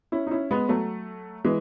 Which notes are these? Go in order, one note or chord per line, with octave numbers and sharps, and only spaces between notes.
C#4 E4
D#4
C#4 E4
G#3 B3
F#3 A3
E3 G#3